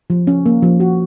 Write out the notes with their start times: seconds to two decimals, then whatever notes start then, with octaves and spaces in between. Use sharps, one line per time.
0.10 F3
0.27 C#4
0.46 A#3
0.63 F3
0.80 F#4